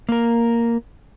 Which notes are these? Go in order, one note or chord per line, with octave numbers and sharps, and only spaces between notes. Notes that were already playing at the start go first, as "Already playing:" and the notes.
A#3 A#4